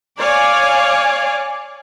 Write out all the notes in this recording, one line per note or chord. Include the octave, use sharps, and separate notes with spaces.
C#5 D5 F5 G#5